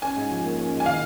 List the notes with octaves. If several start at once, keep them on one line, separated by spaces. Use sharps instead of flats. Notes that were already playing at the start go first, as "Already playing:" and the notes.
C#4 G#5
G#2
F3
A#3
C#4
G#2
G#5
D#3 F5